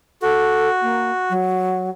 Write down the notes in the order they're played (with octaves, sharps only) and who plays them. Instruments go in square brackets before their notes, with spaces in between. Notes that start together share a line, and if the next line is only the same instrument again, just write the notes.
[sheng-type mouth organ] F#4 [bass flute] A4
[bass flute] A#3
F#3